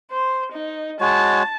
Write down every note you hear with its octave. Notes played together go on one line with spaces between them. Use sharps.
C5
D#4
G#3 F#4 C#5 A5